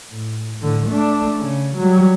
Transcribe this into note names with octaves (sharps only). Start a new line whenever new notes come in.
A2
A2 D3
A3 D4
C#3
F#3 G3